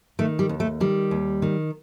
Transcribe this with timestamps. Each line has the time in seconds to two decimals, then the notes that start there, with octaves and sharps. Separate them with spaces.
0.19 D#3 A3
0.39 G3
0.49 D#2
0.60 A3
0.80 D#3 G3
1.11 D#2
1.42 D#3